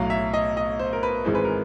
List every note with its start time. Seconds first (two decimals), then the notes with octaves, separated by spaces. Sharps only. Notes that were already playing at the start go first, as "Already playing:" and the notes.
Already playing: B1 A2 F#3 F5
0.10 E5
0.34 D#5
0.57 D#5
0.79 C5
0.93 A#4
1.03 B4
1.25 G#1 G#2 E3 G#3 C5
1.35 B4
1.44 A#4